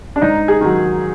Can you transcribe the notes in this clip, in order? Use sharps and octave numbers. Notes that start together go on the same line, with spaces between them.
D4
G#2 D#4
G#4
D#3 F#3